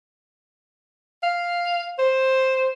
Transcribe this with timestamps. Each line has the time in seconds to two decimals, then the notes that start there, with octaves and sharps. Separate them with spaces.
1.23 F5
1.99 C5